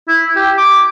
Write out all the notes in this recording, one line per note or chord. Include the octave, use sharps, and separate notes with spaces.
E4
G4
D6